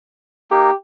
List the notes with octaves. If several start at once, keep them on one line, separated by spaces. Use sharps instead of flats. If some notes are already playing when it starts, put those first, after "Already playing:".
A#3 D#4 G4